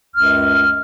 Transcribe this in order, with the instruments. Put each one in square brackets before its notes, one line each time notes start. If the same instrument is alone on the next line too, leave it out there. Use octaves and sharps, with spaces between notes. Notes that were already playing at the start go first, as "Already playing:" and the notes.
[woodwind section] C#2 F#2 F6